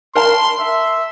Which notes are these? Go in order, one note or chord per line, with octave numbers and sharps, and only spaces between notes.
A#4 A5 A#5 C6
E5